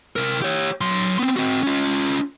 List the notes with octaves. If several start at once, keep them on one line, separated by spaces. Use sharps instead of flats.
C3 A#4
G4 C#5
F#3 C6
B3 C4
C4 F#4
C#4 F4